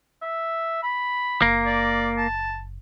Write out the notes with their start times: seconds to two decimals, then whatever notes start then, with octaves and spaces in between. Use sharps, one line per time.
0.21 E5
0.82 B5
1.42 F#1 A#3
1.66 D5
2.17 A5